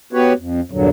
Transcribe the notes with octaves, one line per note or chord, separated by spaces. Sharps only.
B3 F#4 G4 B4 C#5
F2
E2 G2 A#2 D3 F#3